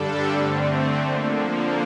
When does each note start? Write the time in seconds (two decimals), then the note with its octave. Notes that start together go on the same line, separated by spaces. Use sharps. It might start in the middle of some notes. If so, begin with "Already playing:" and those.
Already playing: G2 D3 G3 D4 A4
0.27 D3 A3 C4
0.98 D3 F3 A#3